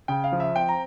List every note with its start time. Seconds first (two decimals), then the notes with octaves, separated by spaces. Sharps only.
0.08 C#3 G5
0.24 F5
0.32 F3
0.40 E5
0.56 C4 G5
0.69 A#5